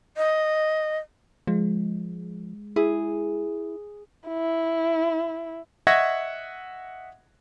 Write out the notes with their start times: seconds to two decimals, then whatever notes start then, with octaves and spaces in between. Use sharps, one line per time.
0.17 D#5
1.47 F3 G#3
2.76 E4 G#4
4.28 E4
5.87 D#5 E5 F#5 C#6 G#6 A#6